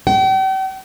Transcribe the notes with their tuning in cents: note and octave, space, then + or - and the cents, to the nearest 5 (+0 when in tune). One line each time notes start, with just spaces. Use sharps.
G5 -40